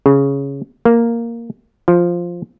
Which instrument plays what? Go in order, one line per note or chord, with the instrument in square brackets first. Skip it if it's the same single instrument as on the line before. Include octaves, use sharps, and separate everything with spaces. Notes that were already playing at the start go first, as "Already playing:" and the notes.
[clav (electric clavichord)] C#3
A#3
F3